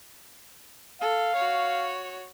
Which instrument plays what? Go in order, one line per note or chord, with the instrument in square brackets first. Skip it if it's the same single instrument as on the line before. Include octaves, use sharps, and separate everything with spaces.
[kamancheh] A4 [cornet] F5
[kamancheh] F#4 C#5